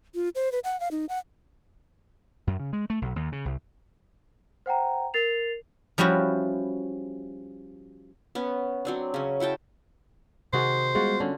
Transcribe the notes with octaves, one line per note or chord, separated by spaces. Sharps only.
F4
C5
B4
F#5
F5
D#4
F#5
F#2
C#3
G#3
A3
B1
D#2
C#3
C2
C5 F#5 G5 A#5
A#4 A6 C7 F7
F3 G3 C#4 E4 F#4
B3 C#4
F#3 C4 D4
C#3 C#4
E4 F#4 G5 A5
C3 D#3 F#4 G#4 C5
G3 G#3 B3 F4 F#4
D3 C#4